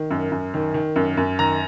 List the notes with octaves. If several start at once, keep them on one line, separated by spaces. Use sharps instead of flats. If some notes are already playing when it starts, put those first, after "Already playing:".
Already playing: D#3
F#2
F#2
D#3
D#3
F#2
F#2
D#3 A#5